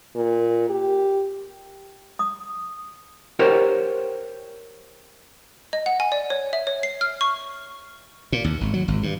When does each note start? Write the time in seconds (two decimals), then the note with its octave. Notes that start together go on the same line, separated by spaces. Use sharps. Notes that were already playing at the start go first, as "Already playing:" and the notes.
0.15 A#2
0.69 G4
2.19 D#6
3.39 G4 A#4 C5 C#5 F#5 G5
5.73 D#5
5.86 F#5
6.00 G#5
6.12 D5
6.30 C#5
6.53 E5
6.67 C#5
6.83 C7
7.01 F6
7.21 C#6
8.32 A#2
8.44 D#2
8.61 G#1
8.74 F#3
8.88 G#1
9.03 G2